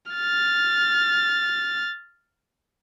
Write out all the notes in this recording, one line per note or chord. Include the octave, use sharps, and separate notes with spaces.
F6 A6